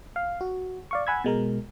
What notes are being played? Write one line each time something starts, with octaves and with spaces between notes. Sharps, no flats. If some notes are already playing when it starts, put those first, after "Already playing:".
F5
F#4
D5 F5 C#6
F#5 G#5 B5 E6 G#6
B2 G#3 A#4